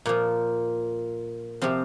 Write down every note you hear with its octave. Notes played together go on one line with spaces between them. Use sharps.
A#2 F3 A#3
C3 F3 C4